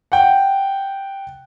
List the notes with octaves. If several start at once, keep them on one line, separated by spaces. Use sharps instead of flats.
F#5 G5